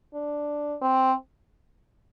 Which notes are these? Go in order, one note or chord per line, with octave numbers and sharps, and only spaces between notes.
D4
C4